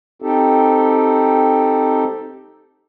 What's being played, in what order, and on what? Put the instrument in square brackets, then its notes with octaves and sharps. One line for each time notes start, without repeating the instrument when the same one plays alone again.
[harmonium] C4 D#4 G4 A4